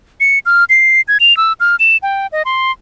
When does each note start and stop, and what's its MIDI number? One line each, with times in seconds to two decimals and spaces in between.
0.20 0.39 97
0.46 0.64 89
0.69 1.01 96
1.08 1.18 92
1.20 1.36 101
1.37 1.53 88
1.60 1.76 89
1.80 1.97 100
2.03 2.27 79
2.32 2.43 75
2.45 2.72 84